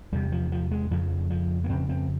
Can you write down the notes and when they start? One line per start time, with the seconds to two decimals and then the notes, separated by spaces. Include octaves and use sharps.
0.12 E2 C3 G3
0.32 F3
0.52 F3
0.71 G#3
0.91 F2 C#3 F3
1.30 F3
1.64 A#3
1.69 F2 C#3 C4
1.89 C4